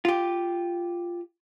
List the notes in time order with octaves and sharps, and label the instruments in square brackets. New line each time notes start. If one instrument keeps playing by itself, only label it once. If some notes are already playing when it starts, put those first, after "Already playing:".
[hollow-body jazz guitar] F4 G4